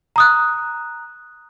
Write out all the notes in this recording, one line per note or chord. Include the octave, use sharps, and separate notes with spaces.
A#5 D#6 F#6